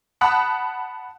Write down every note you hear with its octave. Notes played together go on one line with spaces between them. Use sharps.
F#5 A5 B5 D#6 F#6